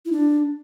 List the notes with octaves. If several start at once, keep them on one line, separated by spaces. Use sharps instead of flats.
E4
D4